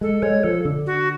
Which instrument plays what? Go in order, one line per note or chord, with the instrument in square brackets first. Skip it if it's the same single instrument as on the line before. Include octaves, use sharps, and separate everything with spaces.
[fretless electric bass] G#3 [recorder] A4
[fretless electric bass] G#3 [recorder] C#5
[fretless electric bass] F3 [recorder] A4
[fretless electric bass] D3
[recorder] F#4